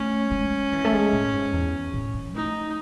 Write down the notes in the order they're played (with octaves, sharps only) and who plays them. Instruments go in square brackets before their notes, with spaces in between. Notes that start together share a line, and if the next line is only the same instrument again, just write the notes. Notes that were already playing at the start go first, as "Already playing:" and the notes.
Already playing: [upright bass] A3 [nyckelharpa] C#4
[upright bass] G#3
E3
A3
G#3
A2
G#2
E2
A2
D#3
[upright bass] A3 [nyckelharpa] D#4